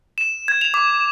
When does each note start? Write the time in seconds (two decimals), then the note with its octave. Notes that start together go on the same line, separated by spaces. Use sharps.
0.18 E7
0.48 G#6
0.61 F7
0.74 D6